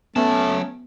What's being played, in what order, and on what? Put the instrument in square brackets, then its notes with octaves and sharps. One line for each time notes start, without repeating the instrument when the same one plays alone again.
[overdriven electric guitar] F#3 A5 [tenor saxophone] A3 [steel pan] B3 [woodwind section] C#4